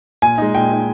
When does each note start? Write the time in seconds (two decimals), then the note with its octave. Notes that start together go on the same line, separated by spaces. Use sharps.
0.22 A#2 G#5
0.38 G#3 D#4
0.55 A#2 G5
0.71 G#3 D#4